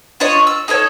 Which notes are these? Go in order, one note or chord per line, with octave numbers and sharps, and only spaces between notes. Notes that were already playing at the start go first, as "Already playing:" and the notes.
D4 F4 C#5 D#5
E6
D#4 A4 A#4 C#5